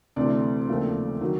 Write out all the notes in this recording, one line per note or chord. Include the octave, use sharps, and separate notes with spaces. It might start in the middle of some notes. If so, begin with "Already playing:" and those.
D2 C3 E3 A3 D5
D#2 C#3 F3 A3 C4
D#3 F#3